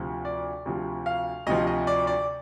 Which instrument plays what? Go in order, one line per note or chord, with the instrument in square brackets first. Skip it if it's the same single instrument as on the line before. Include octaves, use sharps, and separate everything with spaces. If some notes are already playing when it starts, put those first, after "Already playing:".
Already playing: [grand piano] D2 C3 F3
D5
D2 C3 F3
F5
D2 C3 F3 D#5
D#5
D5
D5